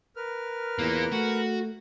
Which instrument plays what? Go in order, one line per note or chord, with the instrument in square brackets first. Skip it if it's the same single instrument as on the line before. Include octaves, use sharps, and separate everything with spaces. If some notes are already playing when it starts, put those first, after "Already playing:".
[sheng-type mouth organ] A#4 B4 F6
[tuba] E2 [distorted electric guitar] A#3 F4
[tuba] A3 [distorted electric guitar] F#4